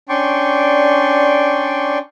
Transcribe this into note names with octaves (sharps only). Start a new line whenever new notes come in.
C#4 D4 D5 G5 C6 C#6